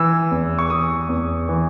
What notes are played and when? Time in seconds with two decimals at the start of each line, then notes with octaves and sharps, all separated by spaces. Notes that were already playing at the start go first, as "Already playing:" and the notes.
Already playing: E3 E6
0.31 E2
0.59 C#6
0.70 E3 D#6
1.09 E2
1.49 E3